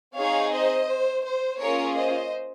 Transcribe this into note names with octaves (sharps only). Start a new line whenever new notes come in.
C4 D#4 G#4 C#5 F5
C5 D#5
C5
C5
A#3 C#4 F4 G#4 A#4 C#5
C5 D#5